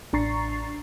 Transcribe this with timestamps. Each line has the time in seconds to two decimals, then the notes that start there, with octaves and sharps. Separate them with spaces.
0.13 A1 D4 A#5 C#6 A6 C7